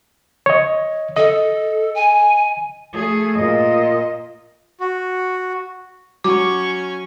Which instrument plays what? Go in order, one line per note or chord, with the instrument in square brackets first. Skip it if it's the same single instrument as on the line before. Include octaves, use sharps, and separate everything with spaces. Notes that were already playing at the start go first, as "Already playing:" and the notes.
[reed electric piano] C#5 D#5
[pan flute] A4 [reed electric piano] D#5
[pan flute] G#5
[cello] A3 G#4
A#2 D#5
[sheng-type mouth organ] F#4
[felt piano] F#3 [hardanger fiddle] C#4 C#6 [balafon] D6